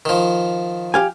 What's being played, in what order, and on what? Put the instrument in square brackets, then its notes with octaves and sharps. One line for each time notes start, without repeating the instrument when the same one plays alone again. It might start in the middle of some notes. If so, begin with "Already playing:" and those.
[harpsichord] D#3 F3
[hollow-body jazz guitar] G4 F5 G#5